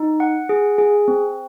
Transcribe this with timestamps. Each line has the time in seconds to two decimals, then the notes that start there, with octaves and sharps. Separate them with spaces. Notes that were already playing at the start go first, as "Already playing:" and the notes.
Already playing: D#4
0.20 F#5
0.49 G#4
0.78 G#4
1.08 C4